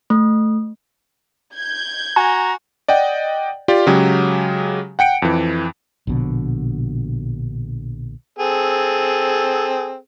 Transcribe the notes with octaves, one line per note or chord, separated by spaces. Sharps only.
A3
G6 G#6
F#4 G#5 A#5
D5 D#5 F#5 G5
F4 G4 D5
C#3 F#3 G#3 G4
F#5 G5 C#7 D7
F2 E3
A#1 B2 D3
C4 G#4 A4